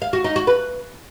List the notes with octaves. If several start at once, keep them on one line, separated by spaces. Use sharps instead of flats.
F5
F#4
D#4
F#4
B4